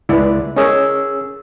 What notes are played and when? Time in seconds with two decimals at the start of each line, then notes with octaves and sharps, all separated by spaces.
0.09 C#2 G#3 E4 B4 D5
0.56 C#4 G#4 A#4 C#5 D#5 E6